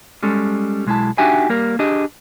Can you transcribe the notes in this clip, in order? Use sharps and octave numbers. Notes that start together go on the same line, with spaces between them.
G3 G#3 C#4 A4
B1 G#3 A3 E4 A5
D4 D#4 F#4 G4 E5 G#5
G3 A#3 A#4
D4 G4 G#4 D#5